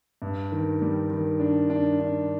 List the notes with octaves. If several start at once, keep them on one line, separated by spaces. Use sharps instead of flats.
G2
D#3
G3
D#3
D4
D4
D4